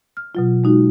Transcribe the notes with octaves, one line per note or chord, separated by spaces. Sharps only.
F6
B2 F#3 F4
G#3 D#4 F#4